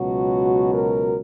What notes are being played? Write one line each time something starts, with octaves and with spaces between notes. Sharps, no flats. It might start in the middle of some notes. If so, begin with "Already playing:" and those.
Already playing: C#2 B2 F#3 F#4
A#4